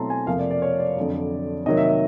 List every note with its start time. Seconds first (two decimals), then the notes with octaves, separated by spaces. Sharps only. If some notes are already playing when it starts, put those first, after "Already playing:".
Already playing: B2 F#3 A3 C4 E4 A5 A#5 C6
0.10 G#5
0.27 F2 C3 F3 A#3 F5
0.39 D5
0.51 D5
0.62 C#5
0.79 D5
0.97 F2 D3 F#3
1.66 C3 D#3 F#3 A#3 D#5
1.77 E5
1.89 E5